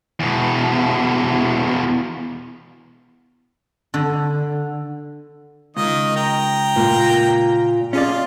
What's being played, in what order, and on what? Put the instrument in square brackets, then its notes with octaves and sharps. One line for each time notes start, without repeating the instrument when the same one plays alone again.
[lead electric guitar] E2 B2
[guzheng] D3
[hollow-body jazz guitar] C#2 [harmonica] D#3 D#5
[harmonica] G5 A#5
[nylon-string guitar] A#2
[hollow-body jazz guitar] C#4 G#4 D5 [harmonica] F4